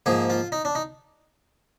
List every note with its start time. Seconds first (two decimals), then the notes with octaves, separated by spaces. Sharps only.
0.06 G#2 F3 A#3 G#4
0.30 F4
0.52 D#4
0.65 D4
0.75 D#4